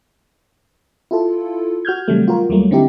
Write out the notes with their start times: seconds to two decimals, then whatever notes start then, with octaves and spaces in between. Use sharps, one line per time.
1.11 E4 F4 A4
1.85 F#4 F6 G6 G#6
2.08 C3 D#3 F#3 G3 A3
2.28 F4 F#4 A#4
2.49 D#2 F#3 G3 A3 A#3
2.71 D3 C4 D#4 E4 G4